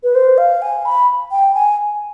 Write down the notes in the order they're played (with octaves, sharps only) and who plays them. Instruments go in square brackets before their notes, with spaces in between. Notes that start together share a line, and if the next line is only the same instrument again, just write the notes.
[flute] B4
C5
F5
G#5
B5
G5
G#5